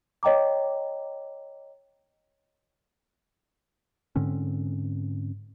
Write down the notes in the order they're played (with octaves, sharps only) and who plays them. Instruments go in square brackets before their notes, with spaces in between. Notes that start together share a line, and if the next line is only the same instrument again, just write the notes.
[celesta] C#5 D#5 G5 A#5 D6
[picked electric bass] G#2 D3 C4 C#4